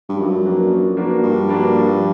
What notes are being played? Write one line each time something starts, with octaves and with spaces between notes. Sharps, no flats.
G2
F#2 F3
A#3 D4 F#4 B4
F3
A#3 D4 F#4 B4
G2 F3
A#3 D4 F#4 B4
F3